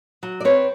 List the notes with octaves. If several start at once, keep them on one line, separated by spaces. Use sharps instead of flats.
F#3
D5
C4 B4 C#5